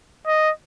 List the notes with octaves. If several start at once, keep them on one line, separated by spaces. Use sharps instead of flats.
D#5